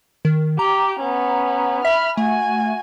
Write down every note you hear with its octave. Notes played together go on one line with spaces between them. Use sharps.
D#3
G4 A#5
B3 C#4
E5 B5 F6
A3 F#4 G#5